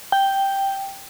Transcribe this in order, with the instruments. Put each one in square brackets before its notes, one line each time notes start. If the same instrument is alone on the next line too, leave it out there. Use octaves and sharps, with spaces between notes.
[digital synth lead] G5